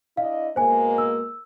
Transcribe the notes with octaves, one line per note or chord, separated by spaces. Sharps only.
D4 E4 D#5 F5
B2 G#3 A#3 C5 G#5
E6